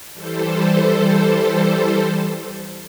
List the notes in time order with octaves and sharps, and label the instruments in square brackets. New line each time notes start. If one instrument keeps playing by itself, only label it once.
[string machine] E3 G3 A4 C5